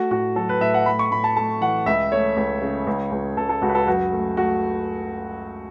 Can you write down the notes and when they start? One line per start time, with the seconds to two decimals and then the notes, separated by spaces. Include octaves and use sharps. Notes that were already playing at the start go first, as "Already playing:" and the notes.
Already playing: A3 F#4
0.11 A2 F#4
0.36 F#3 A4
0.49 B4
0.61 A2 E5
0.74 F#5
0.86 A3 B5
0.99 C#6
1.11 A2 B5
1.24 A5
1.36 A3 A5
1.61 E3 F#5
1.86 C#2 E5
2.12 A3 C#5
2.37 C#2
2.62 C#3
2.87 C#2
3.11 C#2
3.37 C#2 A4
3.49 A4
3.62 C#2 F#4
3.69 B4
3.75 A4
3.87 F#2 F#4
4.12 A3
4.37 A3 F#4